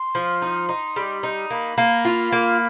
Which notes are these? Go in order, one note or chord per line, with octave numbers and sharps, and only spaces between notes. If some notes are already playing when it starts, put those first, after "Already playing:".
Already playing: C6
F3
D#4
D#4
G3
D#4
A#3 B5
A#3
F4
A#3